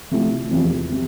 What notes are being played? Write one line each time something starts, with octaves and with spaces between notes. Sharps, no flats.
C3 F3 A3 E4
E2 C3 F3
C3